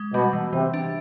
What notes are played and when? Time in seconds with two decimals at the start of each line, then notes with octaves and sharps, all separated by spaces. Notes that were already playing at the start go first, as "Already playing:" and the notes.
Already playing: G#3
0.13 B2 G3
0.33 E3
0.53 C3 E3
0.74 D4